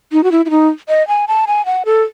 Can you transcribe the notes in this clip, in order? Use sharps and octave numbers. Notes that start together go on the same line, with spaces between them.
D#4
F#4
E4
E4
D#4
D#5
G#5
A5
G#5
F#5
A4